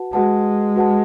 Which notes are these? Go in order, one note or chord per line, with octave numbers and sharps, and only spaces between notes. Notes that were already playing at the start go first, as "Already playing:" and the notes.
Already playing: F#4 B4 F#5 A5
G#3 F#4 B4 F#5 A5
F#4 B4 F#5 A5